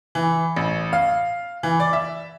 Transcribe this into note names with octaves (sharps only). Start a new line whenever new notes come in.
E3
A1
F5
E3
D5
E5